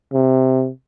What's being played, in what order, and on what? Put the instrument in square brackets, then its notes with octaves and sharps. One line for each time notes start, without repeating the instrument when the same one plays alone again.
[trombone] C3